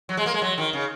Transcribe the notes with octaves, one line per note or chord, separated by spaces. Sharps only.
F#3
G#3
A#3
G#3
F#3
D#3
C#3